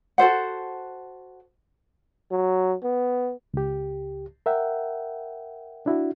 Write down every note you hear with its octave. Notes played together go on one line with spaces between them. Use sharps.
F#4 A4 C5 F#5
F#3
B3
C#2 G4
A#4 E5 F#5 G5
D4 E4 F#4